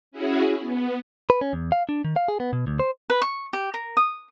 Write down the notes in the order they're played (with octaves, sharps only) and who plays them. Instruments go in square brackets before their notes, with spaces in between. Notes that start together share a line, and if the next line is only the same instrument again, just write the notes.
[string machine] C#4 E4 F#4 G#4
B3
[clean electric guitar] B4
C#4
E2
F5
D4
D#3
F5
G#4
B3
B2
D2
C5
[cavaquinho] B4
C#6
G4
A#4
D#6